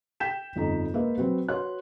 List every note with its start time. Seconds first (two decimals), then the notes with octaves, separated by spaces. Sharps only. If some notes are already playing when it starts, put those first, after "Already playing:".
0.20 G5 G6 B6 E7
0.56 G1 F2 D#4 D#5 A#5
0.94 G#3 A#3 G#4 B4 D#5 E5
1.18 F#3 C4 F#4 B4
1.48 F#4 B4 C#5 C6 F#6